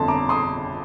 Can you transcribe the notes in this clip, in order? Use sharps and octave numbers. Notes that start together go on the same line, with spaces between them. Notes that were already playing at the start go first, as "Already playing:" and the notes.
Already playing: G1 F2 D3 A5 C6
A#5 D6
C6 D#6